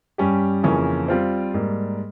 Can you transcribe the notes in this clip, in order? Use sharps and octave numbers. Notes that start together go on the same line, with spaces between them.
G2 G3 C#4 G4
F2 C#3 E3 A#3 C#4
G3 C4 F4 C5
G#2 G3 A#3